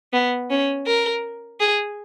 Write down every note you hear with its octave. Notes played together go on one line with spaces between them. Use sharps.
B3
C#4
A#4
G#4